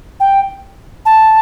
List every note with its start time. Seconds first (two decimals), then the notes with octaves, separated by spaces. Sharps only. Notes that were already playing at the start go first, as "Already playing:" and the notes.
0.20 G5
1.06 A5